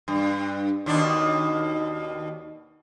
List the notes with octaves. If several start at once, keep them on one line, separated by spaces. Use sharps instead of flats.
G2
D#2 B2 D4